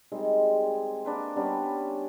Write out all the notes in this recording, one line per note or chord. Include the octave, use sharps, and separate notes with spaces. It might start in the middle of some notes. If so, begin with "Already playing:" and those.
D#3 G3 G#3 C4
G#4
A#3 D4 B4 C5
G3 B3 C#4 D4